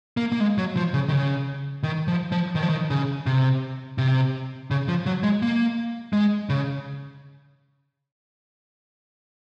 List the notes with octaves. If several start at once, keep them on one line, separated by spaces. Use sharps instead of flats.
A#3
A#3
G#3
F#3
F3
C#3
D#3
C#3
D#3
F3
F3
D#3
F3
D#3
C#3
C3
C3
C#3
F3
F#3
G#3
A#3
G#3
C#3